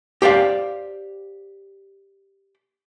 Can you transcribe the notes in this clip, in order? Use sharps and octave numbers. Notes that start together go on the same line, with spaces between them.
G4 C5 D5 F5